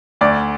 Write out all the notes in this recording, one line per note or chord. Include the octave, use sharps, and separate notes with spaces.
D2 D5